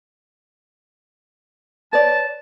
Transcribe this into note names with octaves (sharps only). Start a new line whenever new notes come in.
B4 C#5 D5 A5